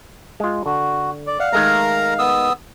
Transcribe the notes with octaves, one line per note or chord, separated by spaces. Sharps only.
G#3 F4
D3 F#4
D5
D5 F5 F#5
D#3 G#3 A3 A#4 A#5
B3 D#6 E6